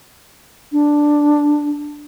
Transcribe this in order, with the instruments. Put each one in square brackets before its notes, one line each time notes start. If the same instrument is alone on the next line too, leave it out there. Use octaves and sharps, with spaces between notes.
[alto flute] D4